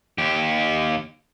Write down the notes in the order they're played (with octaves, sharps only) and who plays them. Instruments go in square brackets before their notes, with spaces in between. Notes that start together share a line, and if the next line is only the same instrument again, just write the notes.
[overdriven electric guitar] D#2 G4